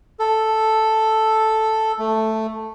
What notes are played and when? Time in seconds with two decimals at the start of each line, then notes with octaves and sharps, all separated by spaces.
0.19 A4
1.99 A3